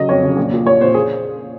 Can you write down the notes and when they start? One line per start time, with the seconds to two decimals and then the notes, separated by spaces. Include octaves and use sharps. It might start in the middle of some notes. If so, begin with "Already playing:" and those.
Already playing: C#3 F#3 D#5
0.09 F2 C#5
0.23 C#3 F#3
0.37 A#1
0.51 A#2 F3
0.66 A#1 C#5
0.81 A#2 F3 C5
0.94 G#4